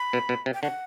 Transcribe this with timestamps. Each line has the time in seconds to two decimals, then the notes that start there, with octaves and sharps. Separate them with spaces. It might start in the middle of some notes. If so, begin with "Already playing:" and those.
Already playing: B5
0.13 B2
0.29 B2
0.46 C3
0.54 G5
0.63 D3 F#5